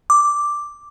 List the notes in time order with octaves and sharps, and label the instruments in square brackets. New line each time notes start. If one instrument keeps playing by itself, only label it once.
[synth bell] D6